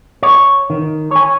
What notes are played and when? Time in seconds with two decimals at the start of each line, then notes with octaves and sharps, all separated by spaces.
0.23 C#5
0.70 D#3
1.11 C#5 G#5